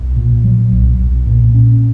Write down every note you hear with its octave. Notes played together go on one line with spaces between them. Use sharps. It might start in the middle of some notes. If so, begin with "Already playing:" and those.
Already playing: B1
A#2
F#3
B1
B1
A#2
C#4